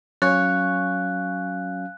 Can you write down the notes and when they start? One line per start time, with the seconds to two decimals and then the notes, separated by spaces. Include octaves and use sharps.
0.22 F#3 C#4 C#5 F5 G#5 F#6